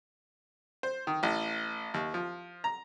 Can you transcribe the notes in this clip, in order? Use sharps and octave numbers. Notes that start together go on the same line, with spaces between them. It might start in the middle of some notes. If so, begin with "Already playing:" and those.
C5
D#3
A1
D#2
F3
A#5